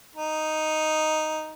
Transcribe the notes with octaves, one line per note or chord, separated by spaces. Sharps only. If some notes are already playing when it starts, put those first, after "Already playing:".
D#4